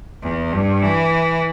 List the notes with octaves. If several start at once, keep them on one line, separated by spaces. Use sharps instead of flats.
E2
G2
E3